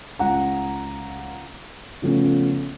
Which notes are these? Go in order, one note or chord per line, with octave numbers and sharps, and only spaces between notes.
C#2 F#5 A#5
C#3 F3 A3 B3 C#4